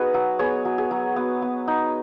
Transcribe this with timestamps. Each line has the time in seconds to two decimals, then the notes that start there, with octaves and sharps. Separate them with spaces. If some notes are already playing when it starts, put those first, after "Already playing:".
Already playing: B3 D#4 F#4 G#4 B4
0.14 F#3
0.39 B3 G#4 C#5
0.65 F#3
0.78 G#4
0.91 F#3
1.16 B3
1.42 B3
1.68 D#4